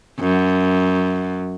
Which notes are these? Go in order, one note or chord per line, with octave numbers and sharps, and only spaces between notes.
F#2